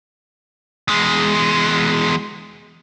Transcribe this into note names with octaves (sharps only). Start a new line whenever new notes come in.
E2 G#3